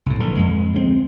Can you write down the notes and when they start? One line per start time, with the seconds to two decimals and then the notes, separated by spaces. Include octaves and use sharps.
0.06 C2 A2
0.19 A#1 D3 E3
0.36 F2 G#3
0.73 D2 G#3 B3 C4